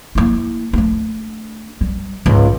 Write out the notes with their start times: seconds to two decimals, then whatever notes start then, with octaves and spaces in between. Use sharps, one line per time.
0.15 A#3 E4
0.73 A3 D4
1.81 G3
2.26 C#2 G#2